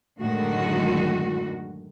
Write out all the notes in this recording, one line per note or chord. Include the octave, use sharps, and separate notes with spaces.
F#2 A2 D3 D#3 G#3 F#4